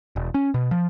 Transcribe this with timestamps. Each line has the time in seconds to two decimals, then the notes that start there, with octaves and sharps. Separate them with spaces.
0.16 E1
0.34 C#4
0.54 B2
0.71 F3